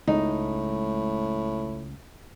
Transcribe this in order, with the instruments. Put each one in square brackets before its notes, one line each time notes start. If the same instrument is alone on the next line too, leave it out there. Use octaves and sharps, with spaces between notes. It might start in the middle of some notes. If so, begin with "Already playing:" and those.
[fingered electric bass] C#2 G#3 [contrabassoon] A2 [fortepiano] D#4